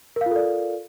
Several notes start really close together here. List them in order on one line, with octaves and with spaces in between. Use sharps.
A#4 F5 F4 A4 D5